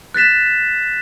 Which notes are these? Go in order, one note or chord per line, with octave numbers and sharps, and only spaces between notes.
F#6 A6 B6 E7